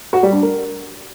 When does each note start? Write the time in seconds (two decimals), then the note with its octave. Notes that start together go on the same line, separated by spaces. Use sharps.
0.13 F#4
0.23 G3
0.33 D4
0.42 A#4